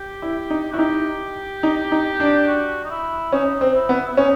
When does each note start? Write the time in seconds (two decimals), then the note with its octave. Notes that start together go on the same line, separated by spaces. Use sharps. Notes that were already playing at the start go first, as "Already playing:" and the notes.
Already playing: G4
0.22 E4
0.50 D#4
0.72 E4 F#4
0.78 D#4 G4
1.63 D#4
1.92 D#4
2.20 D4
2.48 F#4
2.85 D#4
2.90 E4
3.32 C#4 D#4
3.61 C4
3.74 E4
3.89 B3
4.06 E4
4.17 C#4 D#4